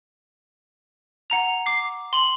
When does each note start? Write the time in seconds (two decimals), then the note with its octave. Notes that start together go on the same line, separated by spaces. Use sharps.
1.30 F#5 A#5 F7
1.66 D6 C7
2.13 C6 F#7